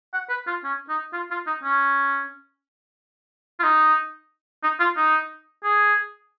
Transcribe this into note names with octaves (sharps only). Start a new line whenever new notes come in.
F#5
B4
F4
C#4
D#4
F4
F4
D#4
C#4
F4
D#4
D#4
F4
D#4
G#4